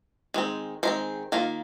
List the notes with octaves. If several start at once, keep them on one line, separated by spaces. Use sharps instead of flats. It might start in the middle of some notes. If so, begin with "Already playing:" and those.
D#3 G#3 C4
D#3 G#3 C4 C5
D#3 A#3 F4